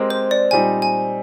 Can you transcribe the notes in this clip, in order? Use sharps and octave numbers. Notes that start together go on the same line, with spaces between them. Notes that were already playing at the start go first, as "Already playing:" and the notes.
Already playing: G#3 C4 G4 A#4
C5
D5
A#2 G3 C4 D#4 G#5
G#5